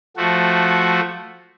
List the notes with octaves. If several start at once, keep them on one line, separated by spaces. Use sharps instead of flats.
F3 A3 F#4